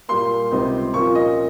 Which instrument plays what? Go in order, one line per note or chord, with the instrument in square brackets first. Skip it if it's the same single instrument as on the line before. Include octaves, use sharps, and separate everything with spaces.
[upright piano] A#2 G3 A#3 C6
C#2 C3 G3 C4 D#4
A#2 F3 A#3 C#4 F4 C#6
D#5